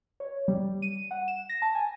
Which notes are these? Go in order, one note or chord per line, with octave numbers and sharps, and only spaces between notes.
C#5
G3
D#7
F#5
E7
A#6
A5
G#5